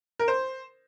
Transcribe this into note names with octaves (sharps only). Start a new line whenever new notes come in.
A#4
C5